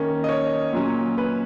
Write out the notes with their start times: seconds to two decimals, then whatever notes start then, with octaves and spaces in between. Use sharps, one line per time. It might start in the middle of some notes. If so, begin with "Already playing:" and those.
Already playing: D#3 A#3 C#4
0.24 D#5
0.29 C#5
0.73 A#2 F#3 C#4
1.18 B4